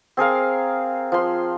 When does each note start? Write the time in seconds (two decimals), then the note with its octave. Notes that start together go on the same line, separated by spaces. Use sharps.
0.17 C4 G#4 A#4 F5
1.12 F3 C6